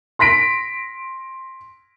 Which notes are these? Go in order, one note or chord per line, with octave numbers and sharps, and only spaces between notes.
C6 A#6 B6 D7